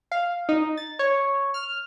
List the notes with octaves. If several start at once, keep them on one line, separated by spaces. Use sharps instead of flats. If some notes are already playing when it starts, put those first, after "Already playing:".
F5
D#4
A6
C#5
F6